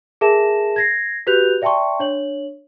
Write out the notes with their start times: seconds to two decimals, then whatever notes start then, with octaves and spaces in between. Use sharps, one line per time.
0.21 G#4 A#4 E5 A5 A#6 E7
0.76 G#6 A#6 C7
1.27 F#4 G4 B4 F#6 G6 F7
1.62 D5 E5 G5 A5 C6 C#6
1.99 D4 C#5 F#7